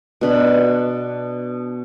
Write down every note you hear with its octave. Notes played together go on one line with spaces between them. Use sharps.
B2 D4 B5